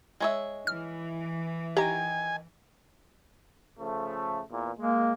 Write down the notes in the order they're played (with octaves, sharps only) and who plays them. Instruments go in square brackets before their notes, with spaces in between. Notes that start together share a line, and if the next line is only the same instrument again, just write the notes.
[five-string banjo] G#3 C#5 E5
[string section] E3 [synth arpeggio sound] F6
[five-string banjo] D#3 A#5 [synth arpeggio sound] G4 [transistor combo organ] G#5
[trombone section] C#3 F3 A3
E2 A#2
[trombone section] G#3 [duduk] A#3